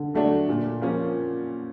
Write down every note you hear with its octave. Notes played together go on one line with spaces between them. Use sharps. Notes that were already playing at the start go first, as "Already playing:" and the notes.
Already playing: D3
F#3 A3 D4
A#2
F3 A#3 C#4